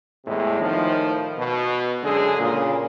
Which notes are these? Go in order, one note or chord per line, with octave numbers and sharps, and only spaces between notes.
E2 A2 C3 G#3
A2 D#3 F3
B2
F#2 D3 G#3 G#4
A#2 C#3